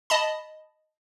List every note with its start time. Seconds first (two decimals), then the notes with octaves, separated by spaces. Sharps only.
0.10 D#5 A5 B5